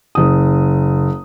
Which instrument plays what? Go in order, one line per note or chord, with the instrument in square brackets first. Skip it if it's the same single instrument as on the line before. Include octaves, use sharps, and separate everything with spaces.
[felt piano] F#1 D#6